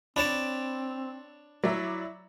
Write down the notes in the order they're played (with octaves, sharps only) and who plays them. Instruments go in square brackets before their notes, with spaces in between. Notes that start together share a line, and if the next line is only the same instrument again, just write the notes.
[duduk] C4 [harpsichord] D4 C#5 A5 [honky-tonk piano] B5 D7
[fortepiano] F#3 [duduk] E4 [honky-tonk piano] D5 E5 A#5